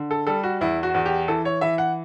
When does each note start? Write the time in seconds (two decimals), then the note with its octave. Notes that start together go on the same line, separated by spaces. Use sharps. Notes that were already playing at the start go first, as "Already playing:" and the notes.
Already playing: D3
0.11 A4
0.27 G3 A4
0.43 F#4
0.61 E2 E4
0.83 F#4
0.94 E2
1.06 G4
1.28 E3 A4
1.45 C#5
1.61 E3 E5
1.78 F#5